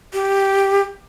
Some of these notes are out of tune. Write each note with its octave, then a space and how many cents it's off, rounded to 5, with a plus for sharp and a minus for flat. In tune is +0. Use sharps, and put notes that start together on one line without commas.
G4 +0